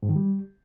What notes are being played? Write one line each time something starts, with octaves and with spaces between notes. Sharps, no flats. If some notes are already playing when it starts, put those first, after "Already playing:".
G#2
D#3
G3